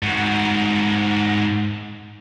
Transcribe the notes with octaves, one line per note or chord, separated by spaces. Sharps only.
G#2 F#4